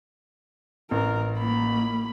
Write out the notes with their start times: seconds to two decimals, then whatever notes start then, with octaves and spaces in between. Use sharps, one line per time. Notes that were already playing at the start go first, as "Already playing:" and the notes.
0.91 A1 A#4
1.38 A#3 B5